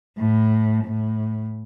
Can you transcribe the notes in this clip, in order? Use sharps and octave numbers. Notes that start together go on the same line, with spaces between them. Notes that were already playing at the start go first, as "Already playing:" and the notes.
A2
A2